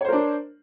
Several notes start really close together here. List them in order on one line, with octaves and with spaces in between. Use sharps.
C#5 C5 A#4 D4